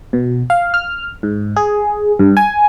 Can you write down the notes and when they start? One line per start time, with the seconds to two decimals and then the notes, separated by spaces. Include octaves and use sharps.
0.13 B2
0.50 F5
0.74 F6
1.23 G#2
1.56 G#4
2.19 G2
2.37 G#5